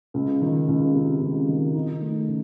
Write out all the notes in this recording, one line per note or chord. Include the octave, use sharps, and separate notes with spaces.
C#2
D#3
C#2
C3
C#2
D#3
D#4
A3
C#3